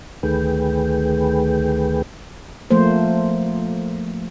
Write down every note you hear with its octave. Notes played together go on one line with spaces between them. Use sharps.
D2 D#3 A3 G#4 B4 G5
F3 A3 A#3 C5